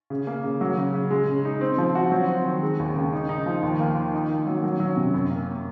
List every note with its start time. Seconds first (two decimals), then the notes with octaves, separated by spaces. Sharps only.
0.10 C#3
0.27 A#3
0.44 C#3
0.61 F#3
0.77 C#3
0.94 C#3
1.11 G#3
1.28 C#3
1.45 D#4
1.61 C4
1.78 F3
1.95 F#4
2.12 F#3
2.29 C4
2.45 D#3
2.62 G#3
2.79 D#2
2.95 C#3
3.13 D#4
3.29 D#4
3.46 F3
3.63 D#2
3.80 A#3
3.97 D#3
4.14 D#4
4.30 A#3
4.47 F#3
4.64 F#3
4.80 F#3
4.97 C3
5.14 F#2
5.31 A#3